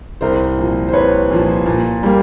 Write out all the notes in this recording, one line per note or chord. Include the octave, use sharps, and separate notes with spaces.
C2 A#4 C5
A#2 F3
C5
C2 B4 C#5
A#2 F3
A#2
G3 A#3